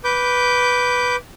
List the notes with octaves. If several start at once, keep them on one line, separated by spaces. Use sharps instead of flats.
B4 D6 G6